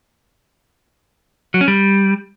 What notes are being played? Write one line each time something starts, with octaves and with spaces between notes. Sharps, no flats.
F#3
C#4
G3